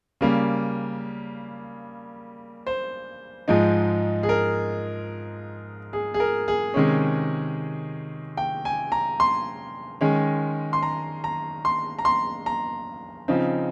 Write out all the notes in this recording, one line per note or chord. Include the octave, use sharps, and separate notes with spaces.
C#3 G3 A#3
C5
G#2 F3 G#3 D#4
G#4
A#4
G#4
G#4
A#4
G#4
C3 D#3 G#3 C#4
G5
G#5
A#5
C6
D#3 G#3 C#4
C6
A#5
A#5
C6
A#5
C6
A#5
C#3 F3 C4 D#4